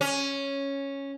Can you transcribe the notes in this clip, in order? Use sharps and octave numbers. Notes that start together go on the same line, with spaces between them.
C#4